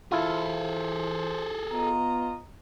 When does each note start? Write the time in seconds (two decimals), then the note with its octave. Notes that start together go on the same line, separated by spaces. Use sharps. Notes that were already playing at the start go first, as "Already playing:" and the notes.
0.12 E3 E4 F4 G#4 A4 C5
1.72 B3 F4 D#5 A#5